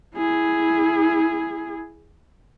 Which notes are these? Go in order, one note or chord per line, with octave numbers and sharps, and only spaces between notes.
E4 G#4